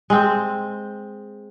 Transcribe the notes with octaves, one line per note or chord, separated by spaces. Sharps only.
G#3 C4